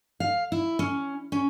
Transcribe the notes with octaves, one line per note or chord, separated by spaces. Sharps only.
F5
E4
C#4
C#4